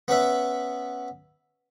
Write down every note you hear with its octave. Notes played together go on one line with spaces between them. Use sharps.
B3 C#4 B4 E5